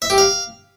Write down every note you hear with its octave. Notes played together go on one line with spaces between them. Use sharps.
E5
G4
F5